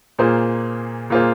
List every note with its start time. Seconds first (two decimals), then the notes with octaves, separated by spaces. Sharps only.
0.19 A#2 A#3 F4 G#4 C5
1.10 A#2 A#3 F4 G#4 C5